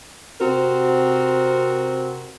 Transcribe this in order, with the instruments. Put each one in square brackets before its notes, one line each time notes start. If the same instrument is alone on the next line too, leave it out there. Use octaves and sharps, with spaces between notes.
[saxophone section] C3 C4 F#4 A#4